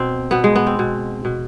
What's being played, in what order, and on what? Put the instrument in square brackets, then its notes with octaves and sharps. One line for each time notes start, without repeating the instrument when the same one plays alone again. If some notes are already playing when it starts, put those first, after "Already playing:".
Already playing: [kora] B2 C4
B2 B3
G#3
B3
C4
B2
B2